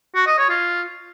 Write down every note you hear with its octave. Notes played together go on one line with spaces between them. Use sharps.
F#4
D#5
C#5
F4